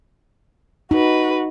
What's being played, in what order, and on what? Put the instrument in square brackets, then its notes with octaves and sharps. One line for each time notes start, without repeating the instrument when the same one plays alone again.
[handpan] D#4 [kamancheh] F#4 B4